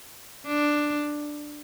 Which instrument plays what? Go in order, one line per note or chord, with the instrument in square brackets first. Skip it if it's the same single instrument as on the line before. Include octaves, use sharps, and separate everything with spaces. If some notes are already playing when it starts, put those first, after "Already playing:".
[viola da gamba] D4